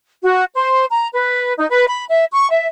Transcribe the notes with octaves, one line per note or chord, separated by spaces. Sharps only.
F#4
C5
A#5
B4
D#4
B4
B5
E5
C#6
E5